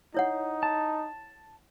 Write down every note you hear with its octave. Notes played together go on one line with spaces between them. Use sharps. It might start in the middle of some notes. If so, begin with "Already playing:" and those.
D#4 E4 C#5 F#5
A5